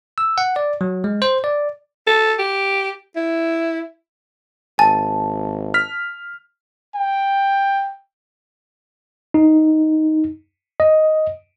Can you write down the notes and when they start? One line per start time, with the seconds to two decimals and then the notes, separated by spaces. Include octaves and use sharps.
0.18 E6
0.38 F#5
0.56 D5
0.81 F#3
1.04 G#3
1.22 C5
1.44 D5
2.07 A4
2.39 G4
3.16 E4
4.79 G#1 G#5 A5
5.74 F6 B6
6.95 G5
9.34 D#4
10.80 D#5